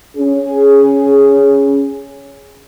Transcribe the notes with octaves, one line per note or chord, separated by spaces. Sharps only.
C#4 G#4